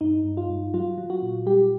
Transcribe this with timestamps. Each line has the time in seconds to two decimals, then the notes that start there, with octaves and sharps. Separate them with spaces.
0.01 G2 D#4
0.25 G2
0.37 F4
0.49 G2
0.74 F#3 F4
0.98 F#3
1.10 F#4
1.22 A#2
1.46 G3 G4